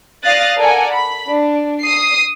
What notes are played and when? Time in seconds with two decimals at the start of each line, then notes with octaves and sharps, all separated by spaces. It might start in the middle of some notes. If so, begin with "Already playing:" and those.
0.24 D5 F5 D#6 F#6 A6 A#6
0.56 A4 A#4 D5 F#5 G#5
0.92 B5
1.25 D4
1.81 D#6 C7